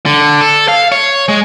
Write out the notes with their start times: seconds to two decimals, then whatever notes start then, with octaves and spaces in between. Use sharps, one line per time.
0.06 D3
0.41 A4
0.68 F5
0.92 C#5
1.29 G#3